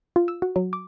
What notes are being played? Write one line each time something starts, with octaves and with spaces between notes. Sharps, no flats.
F4
E6
F#4
F#3
D6